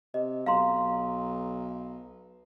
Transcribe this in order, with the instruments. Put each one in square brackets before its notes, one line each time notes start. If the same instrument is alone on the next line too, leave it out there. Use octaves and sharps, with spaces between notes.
[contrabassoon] C3 [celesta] D#5
[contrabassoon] B1 [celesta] F5 A#5 C6